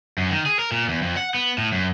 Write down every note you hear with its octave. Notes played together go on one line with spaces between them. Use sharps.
F#2
D#3
G#4
A#4
A#2
E2
F2
F#5
B3
A2
F#2